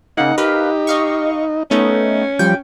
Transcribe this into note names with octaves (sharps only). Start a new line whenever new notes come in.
C#3 A#3 D#4 F#5
G4 A#4 B4 F5
D#5 F5 C#6
A3 B3 C#4 D#4
F3 G3 G5